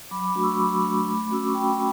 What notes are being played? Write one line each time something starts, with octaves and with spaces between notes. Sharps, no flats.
F#3 B5 D6
B5 D6
A3 D4 F#4
C#6 E6
F#3 B5 D6
A3 D4 F#4
A3
C#4 F#4 E6
D6
C#6
A3 G5 B5